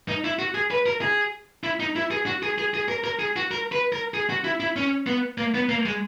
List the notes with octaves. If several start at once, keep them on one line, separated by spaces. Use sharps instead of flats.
D#4
E4
F#4
G#4
B4
A#4
G#4
E4
D#4
E4
G#4
F#4
G#4
G#4
G#4
A#4
A#4
G#4
F#4
A#4
B4
A#4
G#4
F#4
E4
E4
C#4
B3
A#3
B3
A#3
G#3